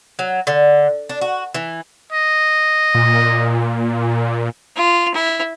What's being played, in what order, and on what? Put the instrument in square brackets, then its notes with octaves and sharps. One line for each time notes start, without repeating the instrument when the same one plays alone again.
[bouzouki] F#3
D3
D4
F#4
E3
[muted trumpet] D#5
[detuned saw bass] A#2
[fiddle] F4
E4